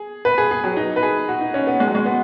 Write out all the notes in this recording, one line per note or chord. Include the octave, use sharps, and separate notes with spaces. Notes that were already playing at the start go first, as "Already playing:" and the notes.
Already playing: G#4
B4
G#4
G#4
F#3
D#4
B4
G#4
F#4
D#4
C#4
B3
G#3
F#3
G#3
B3